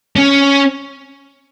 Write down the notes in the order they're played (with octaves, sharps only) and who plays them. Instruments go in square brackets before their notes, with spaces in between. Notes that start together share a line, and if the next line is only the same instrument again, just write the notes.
[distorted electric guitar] C#4